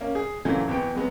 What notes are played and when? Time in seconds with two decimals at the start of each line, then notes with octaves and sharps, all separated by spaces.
0.01 A#3 C#4
0.15 G#4
0.45 A#2 C#3 E3 F#3 A3 A#3
0.68 G#1 E2 B3 G5 D7
0.95 F#3 G#3 B3